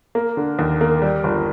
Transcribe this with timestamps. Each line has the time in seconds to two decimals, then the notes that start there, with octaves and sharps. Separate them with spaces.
0.15 A#3
0.37 D3
0.59 D#2
0.81 A#3
1.02 G3
1.24 G1